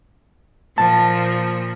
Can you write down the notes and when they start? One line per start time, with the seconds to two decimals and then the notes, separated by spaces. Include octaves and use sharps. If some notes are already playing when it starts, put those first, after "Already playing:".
0.78 A#2 F3 A5